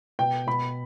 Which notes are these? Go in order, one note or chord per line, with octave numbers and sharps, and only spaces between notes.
B2 G5
B2 B5